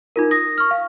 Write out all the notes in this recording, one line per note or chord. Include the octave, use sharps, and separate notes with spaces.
D#4 F4 A#4
D#6 A#6
C#6 F6
F5